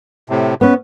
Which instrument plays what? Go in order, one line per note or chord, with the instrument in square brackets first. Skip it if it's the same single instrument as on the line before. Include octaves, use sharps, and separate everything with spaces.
[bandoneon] A2 C3
[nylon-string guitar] B3 C#4 [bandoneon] B4